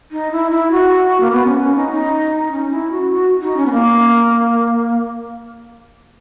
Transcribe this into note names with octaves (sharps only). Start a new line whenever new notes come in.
D#4
E4
E4
F#4
A#3
B3
C#4
C#4
D#4
D#4
C#4
E4
F#4
F#4
D#4
C#4
B3
A#3